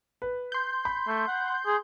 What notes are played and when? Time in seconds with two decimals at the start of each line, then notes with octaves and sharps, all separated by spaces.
0.22 B4
0.52 C6 G6
0.85 B5
1.07 A3
1.28 F#5
1.66 G#4